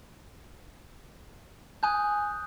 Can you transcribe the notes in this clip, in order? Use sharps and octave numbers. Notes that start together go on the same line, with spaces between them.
G#5 D#6 F#6 G6